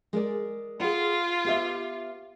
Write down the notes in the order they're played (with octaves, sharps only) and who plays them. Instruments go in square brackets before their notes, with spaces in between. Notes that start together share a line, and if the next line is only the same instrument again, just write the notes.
[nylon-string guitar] G#3 A#4 D5
[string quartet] F4 [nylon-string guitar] G#4 F#5
[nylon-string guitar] B3 G4 E5